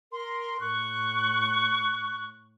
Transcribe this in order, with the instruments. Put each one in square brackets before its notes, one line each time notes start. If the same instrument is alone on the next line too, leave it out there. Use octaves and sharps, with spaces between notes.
[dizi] A#4 [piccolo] C6
[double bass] A2 [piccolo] C#6 [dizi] F#6